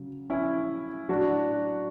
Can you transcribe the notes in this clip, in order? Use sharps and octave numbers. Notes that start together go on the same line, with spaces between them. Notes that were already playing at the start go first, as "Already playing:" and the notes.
Already playing: C#3 F#3
C#4 E4
A2 F#3 D4 F#4